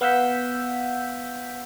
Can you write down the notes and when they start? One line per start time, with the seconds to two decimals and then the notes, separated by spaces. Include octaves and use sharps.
0.01 B3 F5 F#5 E6 G6 B6